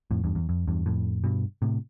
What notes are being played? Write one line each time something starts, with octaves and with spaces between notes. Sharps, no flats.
F2 A2
E2 G2
E2
F2
E2 G2
F2 A2
G2 B2
A2 C3